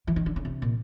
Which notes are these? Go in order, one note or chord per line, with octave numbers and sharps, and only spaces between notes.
E3
D#3
D3
C#3
C3
A#2